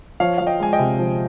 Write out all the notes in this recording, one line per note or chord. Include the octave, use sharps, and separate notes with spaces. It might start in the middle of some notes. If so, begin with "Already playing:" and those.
F3 C#5 F5
F3 F5
D#5 G5
G#3 G#5
D#5 G5
C3
F3